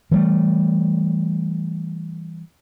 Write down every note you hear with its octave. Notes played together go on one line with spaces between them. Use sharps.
E3 G3 A3